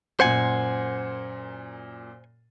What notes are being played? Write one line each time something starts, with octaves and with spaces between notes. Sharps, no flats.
F#2 A#2 C5 F#5 G#5